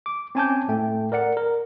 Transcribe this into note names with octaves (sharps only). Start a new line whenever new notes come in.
D6
C4 C#4 G#5 A5 D6 G6
A2 A3 G5
A#4 D5 F#5 C#7
A#4